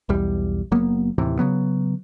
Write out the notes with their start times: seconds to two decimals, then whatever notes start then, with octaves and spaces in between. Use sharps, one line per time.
0.09 B1 E2 G3
0.71 F#1 F#3 A#3 B3
1.18 D#2 A2 C3 E3
1.39 C#3 F#3 B3